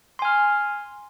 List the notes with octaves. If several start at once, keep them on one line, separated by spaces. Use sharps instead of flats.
G#5 C6 F6